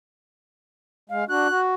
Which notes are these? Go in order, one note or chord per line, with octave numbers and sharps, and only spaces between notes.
G#3 F5
D4 F#4 F#6
F#4